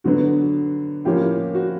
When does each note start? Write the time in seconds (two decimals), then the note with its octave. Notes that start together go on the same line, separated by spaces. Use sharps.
0.04 D3 F#3 B3 F#4
1.05 A2 F3 A#3 C#4 G4
1.55 F#4